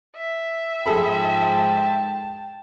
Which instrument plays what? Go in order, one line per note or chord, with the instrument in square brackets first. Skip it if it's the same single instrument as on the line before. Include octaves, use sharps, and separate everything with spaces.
[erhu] E5
[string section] G#2 F3 G#3 [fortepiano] G#4 A4 B5 [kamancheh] G5 A5